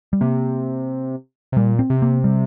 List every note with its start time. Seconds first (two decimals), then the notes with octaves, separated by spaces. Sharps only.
0.13 G3
0.21 C3 A#3
1.52 C3
1.57 A#2 G3
1.79 C4
1.90 C3
2.02 A#3
2.24 G3